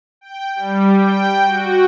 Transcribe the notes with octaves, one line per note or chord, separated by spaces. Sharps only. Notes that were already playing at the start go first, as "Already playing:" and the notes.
G5
G3
G5
F#4